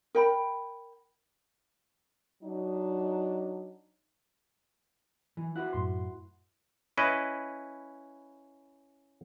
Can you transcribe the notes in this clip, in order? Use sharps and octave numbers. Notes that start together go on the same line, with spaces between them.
A#4 G5 B5
F#3 D4 D#4
E3
E4 F#4 B4 F#5 F#6
F#2 A2 C6
C#4 E4 B4 D#5